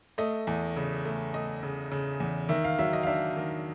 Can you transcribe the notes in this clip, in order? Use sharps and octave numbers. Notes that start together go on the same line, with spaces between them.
A3 D#5
E2
C#3
A3
A3 D#5
C#3
C#3
E2
D#3 E5
F5
F#3 E5
D#5
F5
D4 E5
D#3